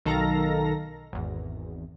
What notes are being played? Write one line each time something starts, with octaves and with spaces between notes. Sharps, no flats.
B1 D#3 A4 F5 A#5 A#6
G#1 E2